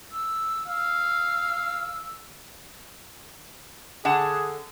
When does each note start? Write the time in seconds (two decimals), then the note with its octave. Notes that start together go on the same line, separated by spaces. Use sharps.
0.12 E6
0.68 F5 E6
4.05 D3 G#4 F#5 A5